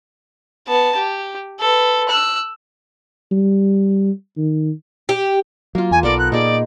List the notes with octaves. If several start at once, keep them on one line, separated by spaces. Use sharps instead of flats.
B3 A5
G4
A4 B4
E6 F#6
G3
D#3
G4
F#3 A#3 F4
E2 G#5
B1 B3 A4 A#4 D5
F#6
A#2 D#4 G#4 D5